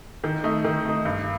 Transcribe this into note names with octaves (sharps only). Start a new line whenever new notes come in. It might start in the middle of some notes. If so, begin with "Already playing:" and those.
D#3
A3 D#4
D#3
A3 D#4
G2